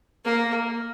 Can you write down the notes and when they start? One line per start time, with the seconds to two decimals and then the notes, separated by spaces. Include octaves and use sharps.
0.25 A#3